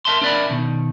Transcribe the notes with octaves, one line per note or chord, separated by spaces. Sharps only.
A#4 E5 A5 C6
D4 A#4 D5 E5 B5
B2 D#3